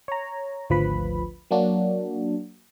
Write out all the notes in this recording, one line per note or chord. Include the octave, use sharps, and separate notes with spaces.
C#5 A#5
G#1 D2 F3 B4 B5
F#3 A#3 D4 F#4